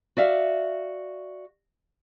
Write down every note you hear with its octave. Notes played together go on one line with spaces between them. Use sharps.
F#4 D5 E5 F5